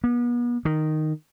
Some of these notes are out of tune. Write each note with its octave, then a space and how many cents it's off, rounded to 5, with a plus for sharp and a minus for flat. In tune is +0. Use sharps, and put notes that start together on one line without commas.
B3 -40
D#3 -5